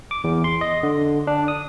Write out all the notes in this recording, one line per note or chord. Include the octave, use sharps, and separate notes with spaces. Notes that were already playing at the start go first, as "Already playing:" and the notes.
D6
E2
C6
D#5
D3
D4
D#6